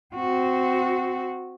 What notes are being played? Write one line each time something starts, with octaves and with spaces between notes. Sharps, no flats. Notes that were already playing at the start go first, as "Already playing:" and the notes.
C4 F#4